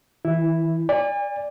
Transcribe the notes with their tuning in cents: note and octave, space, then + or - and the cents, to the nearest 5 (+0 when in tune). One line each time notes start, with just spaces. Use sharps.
E3 -40 E4 +0
D5 -5 G#5 -40